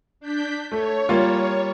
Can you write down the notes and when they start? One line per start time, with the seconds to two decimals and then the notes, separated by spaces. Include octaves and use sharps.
0.20 D4 G6 B6
0.72 A3 C#5
1.09 G3 A#3 F4